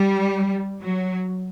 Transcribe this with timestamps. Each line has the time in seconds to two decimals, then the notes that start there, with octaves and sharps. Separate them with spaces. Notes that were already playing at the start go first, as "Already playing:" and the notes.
Already playing: G3
0.80 F#3